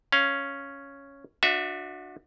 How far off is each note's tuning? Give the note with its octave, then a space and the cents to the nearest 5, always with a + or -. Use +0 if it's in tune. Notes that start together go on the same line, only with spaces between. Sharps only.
C#4 +0 F5 +0
D4 +20 F#4 -25 E5 +0